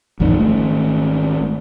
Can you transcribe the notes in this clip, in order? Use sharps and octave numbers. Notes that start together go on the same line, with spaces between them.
A1 F2 G#2 D#3
G#1 A3